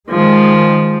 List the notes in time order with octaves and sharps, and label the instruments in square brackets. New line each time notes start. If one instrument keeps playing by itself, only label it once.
[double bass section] D#3 G#3 [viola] F3